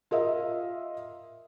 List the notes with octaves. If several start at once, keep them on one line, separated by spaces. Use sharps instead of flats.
F4 A#4 D#5 E5